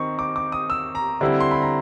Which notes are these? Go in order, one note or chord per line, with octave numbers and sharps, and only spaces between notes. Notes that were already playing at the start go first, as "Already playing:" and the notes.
Already playing: D#3 C4 D#4 C#6
D6
D6
D#6
E6
A#5
D3 G3 C4 E4
C6
B5
A#5